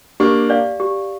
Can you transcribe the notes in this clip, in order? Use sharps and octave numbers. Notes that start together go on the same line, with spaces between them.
A#3 D4 G4
D5 F5
G4